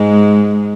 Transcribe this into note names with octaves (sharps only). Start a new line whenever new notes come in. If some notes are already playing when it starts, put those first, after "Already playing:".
Already playing: G#2 G#3